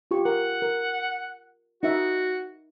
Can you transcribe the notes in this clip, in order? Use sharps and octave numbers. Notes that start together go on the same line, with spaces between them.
F4 G4 C#6
A#4 F#5
A#4
D#4 F#4 E5